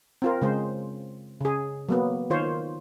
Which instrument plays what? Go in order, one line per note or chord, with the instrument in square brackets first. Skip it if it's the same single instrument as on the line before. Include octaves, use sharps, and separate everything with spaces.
[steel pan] C4 F4 A#4
C#3 G#3 C5
C#3 G#4
F#3 A#3 B3
D#3 F4 C5 C#5